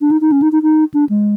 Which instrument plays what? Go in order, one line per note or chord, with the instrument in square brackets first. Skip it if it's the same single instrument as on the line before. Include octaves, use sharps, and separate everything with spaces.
[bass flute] D4
D#4
D#4
C#4
D#4
D#4
D#4
D4
G#3